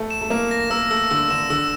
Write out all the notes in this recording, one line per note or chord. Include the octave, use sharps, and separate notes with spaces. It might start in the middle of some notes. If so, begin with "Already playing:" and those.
Already playing: A3
E7
A3
A#3 E7
A#6
A#3 E6
A3 E6
D3 E6
D3 E7
D3 E6